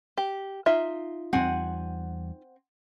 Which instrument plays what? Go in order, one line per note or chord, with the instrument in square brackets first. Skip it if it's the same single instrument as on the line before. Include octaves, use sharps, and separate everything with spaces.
[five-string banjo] G4
D#4 F4 E5
[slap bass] E2 G3 [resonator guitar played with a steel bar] C4 F#5 G#5